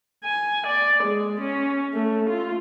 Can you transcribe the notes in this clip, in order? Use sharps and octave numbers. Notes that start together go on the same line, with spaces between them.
G#5
D5
G#3
C#4
A3
F4